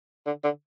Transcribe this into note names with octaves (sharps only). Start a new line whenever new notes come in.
D3
D3